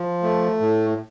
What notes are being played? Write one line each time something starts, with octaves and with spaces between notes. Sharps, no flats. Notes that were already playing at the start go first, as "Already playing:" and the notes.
Already playing: F3
A3
A2